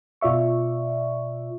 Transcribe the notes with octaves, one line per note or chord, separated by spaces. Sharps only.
B2 F4 D5 E5 C#6